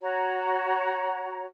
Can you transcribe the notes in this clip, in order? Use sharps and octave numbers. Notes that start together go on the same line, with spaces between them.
F#4 C#5 A#5